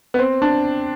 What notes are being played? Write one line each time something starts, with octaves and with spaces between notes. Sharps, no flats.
B3
C4
D4